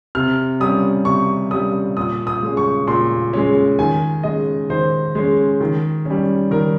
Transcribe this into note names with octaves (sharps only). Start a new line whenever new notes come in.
C3 F6
G3 C#4 D#6
C3 C#6
G3 C#4 D#6
A#2 D#6
D#6
G#3 C#4
C#6
A#2 C6
G#3 C#4
D#3 G#5
G#3 C#4 D#5
D#3 C5
G#3 C#4
D#3
G3 C#4
D#3 A#4